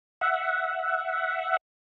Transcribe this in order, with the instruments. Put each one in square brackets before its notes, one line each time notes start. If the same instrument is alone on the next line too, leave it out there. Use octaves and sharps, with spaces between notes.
[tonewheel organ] E5 F#5